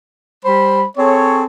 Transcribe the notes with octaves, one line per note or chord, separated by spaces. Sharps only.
G3 C5 B5
C4 G#4 A4 C#5